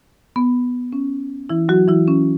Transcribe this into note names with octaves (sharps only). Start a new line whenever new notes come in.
B3
C#4
E3 E4
F#3 F#4
E3 E4
C#4